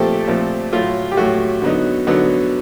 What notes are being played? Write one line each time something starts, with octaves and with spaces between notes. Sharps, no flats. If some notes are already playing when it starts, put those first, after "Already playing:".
Already playing: A#2 F3 A3 C4 G4 A4
A#2 F3 A3 C4
A2 F#3 A3 F4
G4
A2 F#3 A3 F#4
D3 F#3 B3 D#4
D3 F#3 B3 D#4